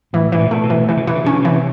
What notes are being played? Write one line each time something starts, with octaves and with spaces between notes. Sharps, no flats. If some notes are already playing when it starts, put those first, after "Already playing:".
A2 E3
B2 E3
A#2
A#2 A3
B2
E3
C3 E3
C#3
C3 E3
C#3
C3 C#4
C#3
C3 E3